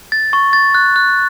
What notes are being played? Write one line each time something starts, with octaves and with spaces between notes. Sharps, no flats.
A6
C#6
A6
F#6
F#6